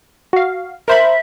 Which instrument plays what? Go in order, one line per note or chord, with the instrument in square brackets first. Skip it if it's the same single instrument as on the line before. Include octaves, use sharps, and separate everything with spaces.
[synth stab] F#4 F5
[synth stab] A#4 C5 B5 [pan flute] E5